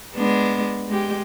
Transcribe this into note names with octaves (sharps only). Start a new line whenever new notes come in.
G#3 B3 D4
G#3 G4